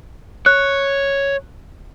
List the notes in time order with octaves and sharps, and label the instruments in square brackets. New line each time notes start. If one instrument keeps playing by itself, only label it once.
[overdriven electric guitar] C#5 [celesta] F#6